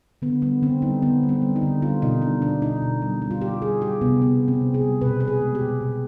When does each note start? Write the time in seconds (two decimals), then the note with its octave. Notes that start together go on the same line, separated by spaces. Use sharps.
0.22 D3 B3
0.42 G3 B3
0.62 D3 C4
0.82 G3 D#4
1.02 D3 B3
1.23 G3
1.29 C4
1.42 G3
1.56 D#4
1.62 D3
1.82 G3 F4
2.02 B2 D#4
2.22 G3 D4
2.42 B2 D4
2.62 B2 D#4
2.82 B2
3.02 G3
3.22 G3
3.31 F4
3.41 G3 G4
3.62 G3 G#4
3.81 G3 G4
4.01 C3 B3
4.22 C3 B3
4.41 C3
4.48 C4
4.61 C3
4.74 G#4
4.81 G3
5.01 B2 B4
5.20 B2 B4
5.28 G#4
5.41 G#3
5.55 G4
5.61 B2
5.81 B2